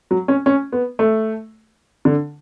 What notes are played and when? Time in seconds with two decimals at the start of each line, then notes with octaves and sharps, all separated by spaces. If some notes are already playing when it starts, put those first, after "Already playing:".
0.11 F#3
0.28 C#4
0.46 C#4
0.72 B3
0.99 A3
2.05 D3